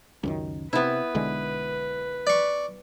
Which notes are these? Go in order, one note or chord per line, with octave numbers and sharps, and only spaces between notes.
C#2 F#2 D#3
C3 B3 E4 B4
B1 D3 G#3
D5 C#6